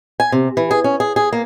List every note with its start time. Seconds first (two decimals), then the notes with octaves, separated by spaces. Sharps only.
0.20 G#5
0.32 C3
0.57 E3
0.71 G#4
0.84 C#4
1.00 G#4
1.16 G#4
1.33 A#3